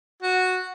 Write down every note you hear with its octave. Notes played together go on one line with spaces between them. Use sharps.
F#4